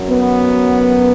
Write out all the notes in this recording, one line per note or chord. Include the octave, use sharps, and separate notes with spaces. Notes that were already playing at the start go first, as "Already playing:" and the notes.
Already playing: F#2 F#3
B3